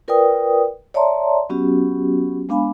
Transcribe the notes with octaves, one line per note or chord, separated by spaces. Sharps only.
F4 A#4 B4 D5 G5 D#6
C#5 D5 E5 A5 A#5 C6
F#3 B3 C#4 F#4 G4
G#3 B3 D4 F5 G#5 B5